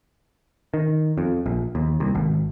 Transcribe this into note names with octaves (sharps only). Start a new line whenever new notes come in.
D#3
F2
A#1
D#2
C2
G#1